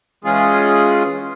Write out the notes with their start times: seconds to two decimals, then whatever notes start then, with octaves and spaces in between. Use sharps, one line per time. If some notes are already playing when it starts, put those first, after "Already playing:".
0.24 E3 G#3 C#4 F4 G#4